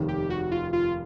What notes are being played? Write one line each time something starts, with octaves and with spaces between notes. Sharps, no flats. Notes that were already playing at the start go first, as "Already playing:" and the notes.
Already playing: F1 D#2 D#3
G4
F#4
F4
F4